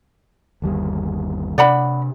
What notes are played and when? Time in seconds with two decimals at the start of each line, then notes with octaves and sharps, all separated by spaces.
0.62 G1 D#2 G3
1.58 C3 D4 D5 F#5 B5